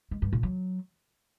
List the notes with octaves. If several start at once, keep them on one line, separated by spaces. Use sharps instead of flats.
G#3
G2
A#2
F#3